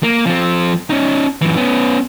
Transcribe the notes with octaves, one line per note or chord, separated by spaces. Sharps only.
A#3
F3 C4
C#4 D#4
F#2 E3
B3 C#4